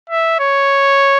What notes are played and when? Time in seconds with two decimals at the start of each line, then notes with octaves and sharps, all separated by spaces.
0.09 E5
0.40 C#5